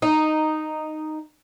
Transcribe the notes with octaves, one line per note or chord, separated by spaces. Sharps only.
D#4